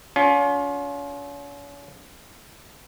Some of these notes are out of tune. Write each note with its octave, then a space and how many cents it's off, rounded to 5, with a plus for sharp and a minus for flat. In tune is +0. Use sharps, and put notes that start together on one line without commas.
C#4 +40 F4 +30